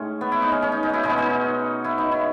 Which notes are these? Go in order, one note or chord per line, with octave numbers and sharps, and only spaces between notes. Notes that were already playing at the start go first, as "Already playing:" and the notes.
Already playing: A2 G#3 C#4 D#4
B3
E4
D#4
C#4
C#4
D#4
D#4
E4 F#4
B2 G#3 D#4
C#4
D#4
E4
D#4
E4